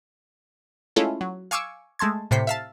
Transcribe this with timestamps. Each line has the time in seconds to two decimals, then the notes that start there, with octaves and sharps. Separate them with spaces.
0.96 G#3 A3 C#4 E4 F4 A4
1.21 F#3
1.51 F5 G#5 C#6 D6 E6
1.99 G#3 A3 A5 C6 G#6
2.31 A2 C3 C5 B6 C#7
2.47 E5 F5 A5